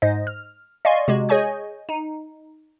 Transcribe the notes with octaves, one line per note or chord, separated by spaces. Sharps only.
G#2 C5 D#5
F6
D5 D#5 F5 G#5 C6 C#6
C3 G#3 F#4
G#4 C#5 D#5 G#5 C#6 G6
D#4